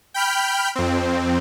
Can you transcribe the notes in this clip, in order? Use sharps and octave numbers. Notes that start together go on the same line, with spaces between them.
G5 B5 F6 G6
F2 C4